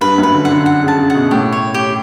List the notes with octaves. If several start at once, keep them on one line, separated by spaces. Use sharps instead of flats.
G2 B4
F#2
B4
D3
F#5
D3
F#5
C#3
A5
C#3
F#5
B2
A2 G4
C#5
G4